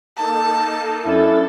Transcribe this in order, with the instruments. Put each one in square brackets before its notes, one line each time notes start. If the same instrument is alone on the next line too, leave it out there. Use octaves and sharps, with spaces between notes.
[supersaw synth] A#3 D#4 A4 [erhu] A5
[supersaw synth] F#2 D4 A6 [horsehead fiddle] C#4 A4 [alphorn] E4